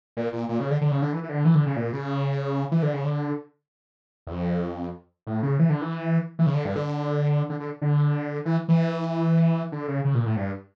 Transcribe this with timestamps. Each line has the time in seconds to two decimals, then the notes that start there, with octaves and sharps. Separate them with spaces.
0.17 A#2
0.33 A#2
0.49 A#2
0.60 C#3
0.71 D3
0.81 D3
0.91 C#3
1.02 D3
1.13 E3
1.23 E3
1.29 D3
1.45 E3
1.55 D3
1.66 C#3
1.76 A#2
1.93 C#3
2.71 E3
2.82 D3
2.94 C#3
3.05 D3
4.27 E2
4.31 F2
5.27 A2
5.43 C#3
5.59 E3
5.70 D3
5.81 E3
6.39 E3
6.46 C#3
6.54 D3
6.65 G2
6.76 D3
7.49 D3
7.60 D3
7.82 D3
8.45 E3
8.68 E3
9.72 D3
9.88 C#3
10.05 C#3
10.15 A#2
10.26 A2
10.37 G2